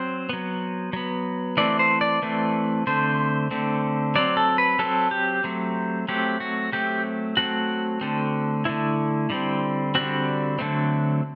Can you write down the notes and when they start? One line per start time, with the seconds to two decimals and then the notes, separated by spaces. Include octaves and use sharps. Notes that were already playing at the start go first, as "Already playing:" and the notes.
Already playing: F#3 C4 C5
0.29 F#3 B3
0.93 F#3 B3
1.57 E3 A3 C4 D5
1.79 C5
2.01 D5
2.22 E3 A3 C4
2.87 D3 A3 C4 C5
3.51 D3 A3 C4
4.15 F#3 C4 D5
4.37 A4
4.58 B4
4.79 F#3 C4 A4
5.11 G4
5.44 F#3 A3 C4
6.08 F#3 A3 C4 G4
6.40 F#4
6.72 F#3 A3 C4 G4
7.37 F#3 A3 C4 F#4
8.01 D3 A3 C4
8.65 D3 A3 C4 E4
9.30 D3 G3 C4
9.95 D3 G3 C4 F#4
10.59 D3 F#3 A3 C4